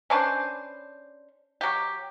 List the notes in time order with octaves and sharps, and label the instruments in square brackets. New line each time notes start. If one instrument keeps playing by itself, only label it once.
[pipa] C#4 D4 B4 C5
F#3 G4